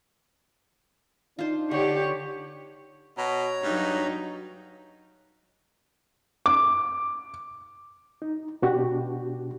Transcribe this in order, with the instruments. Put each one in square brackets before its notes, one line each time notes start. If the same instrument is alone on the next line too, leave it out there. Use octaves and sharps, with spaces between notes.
[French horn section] D4 D#4 [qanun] F4 C5
[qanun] D3 [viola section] G4 [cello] C#5
[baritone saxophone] B2 [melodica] C#5 A#5
[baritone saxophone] G2 [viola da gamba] F#3 D#4
[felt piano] D6
[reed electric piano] D#4
B2 D4 F#4 G4